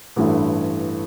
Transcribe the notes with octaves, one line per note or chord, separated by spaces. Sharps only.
A1 G2 E3 A3